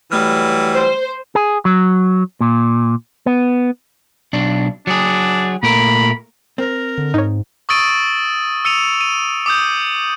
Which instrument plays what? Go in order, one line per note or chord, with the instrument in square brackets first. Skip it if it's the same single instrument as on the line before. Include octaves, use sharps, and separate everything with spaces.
[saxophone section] E3 F#3 G3 [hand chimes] A3 F6
[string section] C5
[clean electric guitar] G#4
F#3
A#2
B3
B1 D4
[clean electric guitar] F#3 G#4 [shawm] D4
[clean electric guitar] A#2 A3 A#4 [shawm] B5
[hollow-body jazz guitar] C4 [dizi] A#4
[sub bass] D3
[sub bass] G#2 [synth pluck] D#4 C#5
[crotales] C#6 D#6 E6 A6 D7 D#7
E6 C#7 D#7 F7
D#7
D6 D#6 G6